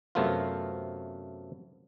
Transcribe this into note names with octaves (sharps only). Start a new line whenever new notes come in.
F#2 C3 A3 B3 F4